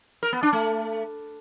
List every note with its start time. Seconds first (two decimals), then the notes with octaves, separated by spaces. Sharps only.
0.23 A#4
0.33 B3
0.43 D4
0.53 A3